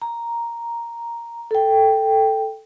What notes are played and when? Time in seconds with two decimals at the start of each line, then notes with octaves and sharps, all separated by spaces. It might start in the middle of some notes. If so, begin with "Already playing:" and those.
0.02 A#5
1.51 A4 G5